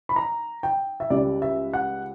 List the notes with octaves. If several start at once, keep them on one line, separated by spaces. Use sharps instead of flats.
B5
A#5
G5
E5
C#2 C#3 G3 D5
E5
F#5